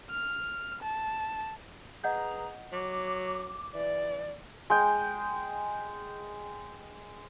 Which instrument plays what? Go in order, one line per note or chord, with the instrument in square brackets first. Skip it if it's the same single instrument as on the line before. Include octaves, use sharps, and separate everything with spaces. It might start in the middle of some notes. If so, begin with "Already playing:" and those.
[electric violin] F6
A5
[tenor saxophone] G#4 [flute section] B4 A#5 [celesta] D#5 F#5 G6
[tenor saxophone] F#3 [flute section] D6
[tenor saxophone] E3 [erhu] D5
[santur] G#3 G5